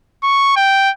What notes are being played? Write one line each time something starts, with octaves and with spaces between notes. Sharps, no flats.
C#6
G5